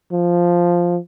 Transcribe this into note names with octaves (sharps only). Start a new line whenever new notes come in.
F3